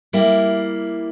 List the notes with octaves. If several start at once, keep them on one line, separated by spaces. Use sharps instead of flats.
G3 A#3 E4